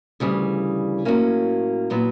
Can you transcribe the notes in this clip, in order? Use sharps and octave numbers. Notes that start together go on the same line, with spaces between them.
D2 C#3 E3 G3
A2 F#3 A#3 C#4
A#2 F#3 B3